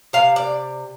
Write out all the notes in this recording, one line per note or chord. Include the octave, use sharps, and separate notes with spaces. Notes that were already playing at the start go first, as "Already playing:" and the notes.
C3 F5
D5